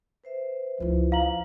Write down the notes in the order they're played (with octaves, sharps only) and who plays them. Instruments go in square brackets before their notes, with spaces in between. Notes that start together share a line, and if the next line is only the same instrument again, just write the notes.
[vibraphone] B4 C5 E5
[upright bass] C#2 E4 [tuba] F3
[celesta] F5 A#5 F#7